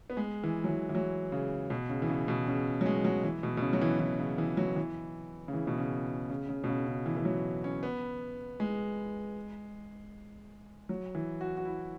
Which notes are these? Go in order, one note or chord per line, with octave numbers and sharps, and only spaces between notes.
B3
G#3
E3
F#3
E3
E3
F#3
C#3
B2
C#3
E3
C#3
B2
C#3
F#3
G#3
F#3
E3
B2
B2
C#3
F#3
E3
E3
C#3
E3
F#3
E3
C#3
E3
B2
C#3
C#3
C#3
B2
C#3
C#3
E3
E3
F#3
C#4
B3
G#3
F#3
E3
F#4
F#4
E4